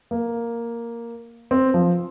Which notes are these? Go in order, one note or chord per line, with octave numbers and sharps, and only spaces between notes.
A#3
C4
F3